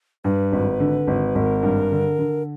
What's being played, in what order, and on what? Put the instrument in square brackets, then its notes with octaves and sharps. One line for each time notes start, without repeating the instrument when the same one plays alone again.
[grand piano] G2 [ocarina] B4
[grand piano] G#1
D3
G#1
[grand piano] G#1 [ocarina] A#4
[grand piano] G2
D3
D3